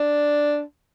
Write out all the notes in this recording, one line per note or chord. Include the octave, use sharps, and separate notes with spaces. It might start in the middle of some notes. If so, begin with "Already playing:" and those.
Already playing: D4